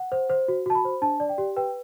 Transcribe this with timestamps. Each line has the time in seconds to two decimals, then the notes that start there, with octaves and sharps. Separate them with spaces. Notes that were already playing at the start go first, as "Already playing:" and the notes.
Already playing: F#5
0.12 C5
0.30 C5
0.48 F#4
0.66 F#4 A5
0.75 B5
0.85 C5
1.02 D4 A5
1.20 D5
1.29 G5
1.38 G4
1.56 B4 G5